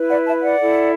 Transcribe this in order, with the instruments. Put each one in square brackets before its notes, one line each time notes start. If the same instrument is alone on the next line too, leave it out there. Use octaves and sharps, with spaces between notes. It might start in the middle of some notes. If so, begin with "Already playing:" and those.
Already playing: [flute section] E4 B4
D5 F#5
E5 A5
D5 F#5
E4 A4